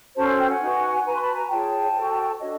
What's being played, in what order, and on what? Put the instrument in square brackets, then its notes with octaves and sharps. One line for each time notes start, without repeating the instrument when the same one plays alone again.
[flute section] C#4 F#4 A4 C5 A5
G#5
G5
F#5 G#5
D#4 F#4 B4
F#4 B4 G#5 A#5
C6
A5 B5
G#5 A#5
F4 G#4 C#5 G5 A5
F#4 A4 C5
D4 F#4 A4 C#5 D#5